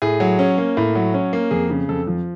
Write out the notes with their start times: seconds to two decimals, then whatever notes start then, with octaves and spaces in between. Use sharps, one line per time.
0.02 A2 G#4
0.20 F#3
0.39 C#4
0.58 A#3
0.77 A2
0.95 F#3
1.14 C#4
1.33 A#3
1.51 F2 G#4
1.70 C#3
1.89 F2 A4
2.07 F3